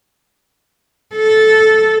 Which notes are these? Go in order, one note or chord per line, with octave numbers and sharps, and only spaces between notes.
A4